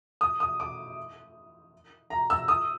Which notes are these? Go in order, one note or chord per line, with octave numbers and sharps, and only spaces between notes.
D#6
D#6
D6
A#5
E6
D#6